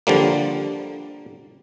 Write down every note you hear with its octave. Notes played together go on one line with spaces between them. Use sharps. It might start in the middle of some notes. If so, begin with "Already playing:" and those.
D3 F3 G3 A#3